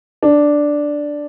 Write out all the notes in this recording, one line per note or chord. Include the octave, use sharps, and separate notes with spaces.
D4